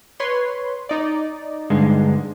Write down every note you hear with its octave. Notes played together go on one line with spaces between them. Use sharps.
B4 C#5 C6
D#4 D5
G2 D3 G#3